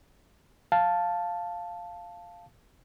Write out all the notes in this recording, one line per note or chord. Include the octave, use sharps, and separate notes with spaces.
F5 A5